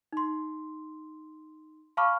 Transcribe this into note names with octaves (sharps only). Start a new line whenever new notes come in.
D#4 C6
F5 A5 B5 C#6 D6 F6